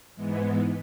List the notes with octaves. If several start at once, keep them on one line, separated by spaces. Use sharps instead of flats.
G#2 E3 G#3 B3